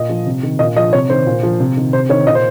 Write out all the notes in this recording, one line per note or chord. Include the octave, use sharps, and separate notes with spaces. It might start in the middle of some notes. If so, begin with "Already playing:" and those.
Already playing: A#2 D#5
F3
C3
D#3
A#2 D#5
F3 D#5
C3 C#5
D#3 C5
A#2
F3
C3
D#3
C3 C5
D#3 C#5
A#2 D#5
C5